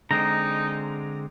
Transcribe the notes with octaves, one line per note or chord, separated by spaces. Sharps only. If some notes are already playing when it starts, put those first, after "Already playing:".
D3 G#3 C4 D#4 A#5